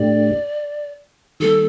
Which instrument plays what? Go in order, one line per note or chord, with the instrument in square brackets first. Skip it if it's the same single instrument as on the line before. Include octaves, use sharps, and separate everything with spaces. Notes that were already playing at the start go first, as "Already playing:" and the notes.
Already playing: [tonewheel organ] A2 A3 D4 G4 [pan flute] D5
[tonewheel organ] D#3 G3 A#3 [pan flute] A4